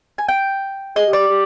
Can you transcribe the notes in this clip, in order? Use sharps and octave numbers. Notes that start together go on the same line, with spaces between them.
G#5
G5
G#4 D#5
G4
D5
G4
G4